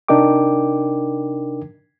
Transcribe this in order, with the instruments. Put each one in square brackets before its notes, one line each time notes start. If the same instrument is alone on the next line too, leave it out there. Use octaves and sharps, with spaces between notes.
[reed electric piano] C3 D4 D#4 A#4 G5 D6